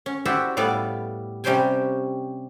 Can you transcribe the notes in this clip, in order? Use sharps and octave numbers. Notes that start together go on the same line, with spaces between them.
C#4
E4 F#4 G4 C5 D5 E5
A2 G3 B3 D5 F5
C3 G3 C#4 C5 G5 G#5